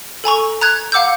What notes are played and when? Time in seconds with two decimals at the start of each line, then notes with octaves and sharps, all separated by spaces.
0.24 A4 G#5 A#5 C#6
0.61 A#5 F#6 G#6
0.92 F5 F#5 D6 E6 G6